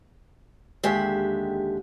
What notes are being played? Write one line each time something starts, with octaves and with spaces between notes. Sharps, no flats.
D#2 D3 G#3 G4 E5